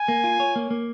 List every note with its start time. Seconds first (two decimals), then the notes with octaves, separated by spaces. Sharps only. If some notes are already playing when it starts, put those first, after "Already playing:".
Already playing: G#5
0.08 A#3
0.24 F4
0.40 C#5
0.56 A#3
0.71 A#3